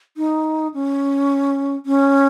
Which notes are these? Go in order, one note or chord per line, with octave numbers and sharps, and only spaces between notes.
D#4
C#4
C#4